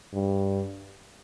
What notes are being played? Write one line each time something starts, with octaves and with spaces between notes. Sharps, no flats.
G2